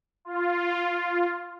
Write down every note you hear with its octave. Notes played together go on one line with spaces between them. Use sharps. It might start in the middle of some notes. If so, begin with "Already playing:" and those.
F4